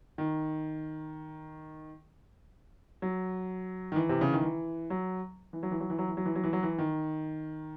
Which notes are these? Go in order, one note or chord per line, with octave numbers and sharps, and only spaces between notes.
D#3
F#3
D#3
E3
C3
C#3
D#3
E3
F#3
E3
F#3
E3
F#3
E3
F#3
E3
F#3
E3
F#3
E3
F#3
E3
D#3